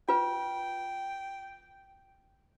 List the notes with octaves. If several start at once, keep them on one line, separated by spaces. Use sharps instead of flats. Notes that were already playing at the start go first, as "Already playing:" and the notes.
F4 B4 G5